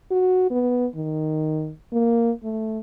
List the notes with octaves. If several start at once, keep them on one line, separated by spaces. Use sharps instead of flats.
F#4
B3
D#3
A#3
A3